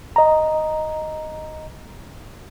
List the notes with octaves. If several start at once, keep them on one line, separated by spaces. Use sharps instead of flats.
D#5 A#5